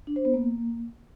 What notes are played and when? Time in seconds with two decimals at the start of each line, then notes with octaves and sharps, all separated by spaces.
0.07 D4
0.16 C5
0.25 B3
0.34 A#3